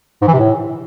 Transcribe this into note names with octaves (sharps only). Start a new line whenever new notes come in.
G#2
E3
C3
A2